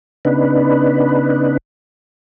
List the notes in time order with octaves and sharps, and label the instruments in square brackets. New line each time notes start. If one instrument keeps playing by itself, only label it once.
[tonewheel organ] C#3 B3 D4 D#4 B4